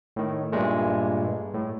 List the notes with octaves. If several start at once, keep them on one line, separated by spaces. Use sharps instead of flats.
A2 D#3
G2 A#2 G#3 A3
A2